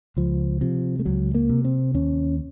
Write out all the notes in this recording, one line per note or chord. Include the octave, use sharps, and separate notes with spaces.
C#2 F3
C3 F3
A3
C#2 F#3
A#3
C3
C4
D#2 C#4